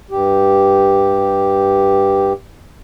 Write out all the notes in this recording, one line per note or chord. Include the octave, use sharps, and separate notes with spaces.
G2 G4